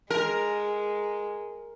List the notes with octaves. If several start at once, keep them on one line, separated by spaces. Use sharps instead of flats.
G#3 A#4